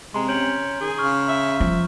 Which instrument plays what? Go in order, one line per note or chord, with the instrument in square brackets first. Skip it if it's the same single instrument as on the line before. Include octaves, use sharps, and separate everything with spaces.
[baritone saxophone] C3 [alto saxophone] G#3 [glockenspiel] A#5 C6
[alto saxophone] C#4 [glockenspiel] G6 D7 F#7
[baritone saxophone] D#3 [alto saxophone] G#4
[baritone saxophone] C#3 [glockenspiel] C#6 F6
[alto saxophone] E5
[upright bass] F3